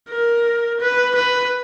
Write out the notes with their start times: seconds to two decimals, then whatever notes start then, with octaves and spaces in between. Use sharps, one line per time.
0.10 A#4
0.80 B4
1.16 B4